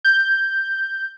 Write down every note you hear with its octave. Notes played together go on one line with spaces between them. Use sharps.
G6